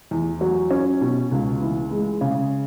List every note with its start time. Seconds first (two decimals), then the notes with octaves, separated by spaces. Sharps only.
0.11 E2
0.41 F#3
0.70 C#4
1.01 B2
1.32 C#2
1.62 E3
1.91 G#3
2.21 C#3